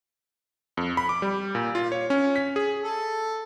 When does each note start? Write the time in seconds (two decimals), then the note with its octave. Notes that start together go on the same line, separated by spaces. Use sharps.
0.77 F2
0.97 B5
1.09 D6
1.22 G3
1.55 A#2
1.75 F4
1.92 C#5
2.10 C#4
2.36 B6
2.56 G#4
2.84 A4